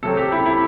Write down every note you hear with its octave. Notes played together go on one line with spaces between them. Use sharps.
C3 F#3 C4 A4
G4
E4
E4